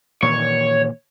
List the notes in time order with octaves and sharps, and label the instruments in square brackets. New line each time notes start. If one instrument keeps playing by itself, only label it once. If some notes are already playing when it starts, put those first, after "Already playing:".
[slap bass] A#2 D#3 E3 [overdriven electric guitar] C#5